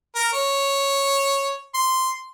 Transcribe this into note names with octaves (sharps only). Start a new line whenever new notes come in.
A#4
C#5
C6